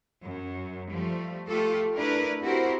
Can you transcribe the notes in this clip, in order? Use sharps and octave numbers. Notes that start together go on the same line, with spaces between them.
F#2
F3 G3 A3
A3 F4 G4 A4
A3 D4 E4 A#4 B4
C4 E4 F#4 G4 A#4 C5